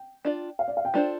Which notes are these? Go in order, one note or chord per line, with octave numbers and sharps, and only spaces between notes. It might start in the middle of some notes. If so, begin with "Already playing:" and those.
Already playing: G5
D4 F4 D5
F5
D5
F5
G5
G3 D4 F4 A4 C5